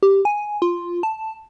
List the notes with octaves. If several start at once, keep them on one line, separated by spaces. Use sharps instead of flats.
G4
G#5
F4
A5